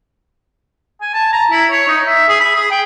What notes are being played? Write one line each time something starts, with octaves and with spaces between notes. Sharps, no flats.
G#5
A5
A#5
E4
C#5
D#4
E5
G#4
B5
G#4
G5